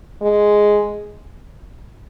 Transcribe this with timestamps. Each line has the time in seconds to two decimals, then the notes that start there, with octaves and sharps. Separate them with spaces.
0.21 G#3